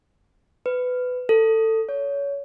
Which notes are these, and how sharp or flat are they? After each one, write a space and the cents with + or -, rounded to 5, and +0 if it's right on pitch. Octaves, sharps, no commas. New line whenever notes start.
B4 +20
A4 +20
C#5 +25